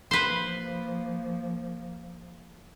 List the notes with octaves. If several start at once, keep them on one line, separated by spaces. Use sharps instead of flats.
F3 A#3 B4 C5